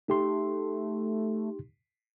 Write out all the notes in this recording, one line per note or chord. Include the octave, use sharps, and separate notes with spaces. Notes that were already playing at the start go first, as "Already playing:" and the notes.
A3 D#4 G4 C6